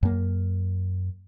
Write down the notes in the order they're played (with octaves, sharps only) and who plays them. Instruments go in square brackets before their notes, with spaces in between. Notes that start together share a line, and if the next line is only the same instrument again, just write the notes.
[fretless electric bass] F#2 A#3